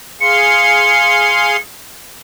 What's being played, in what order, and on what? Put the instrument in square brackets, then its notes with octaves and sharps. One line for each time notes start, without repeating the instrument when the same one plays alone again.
[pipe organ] G#4 F5 C6 [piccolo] C#7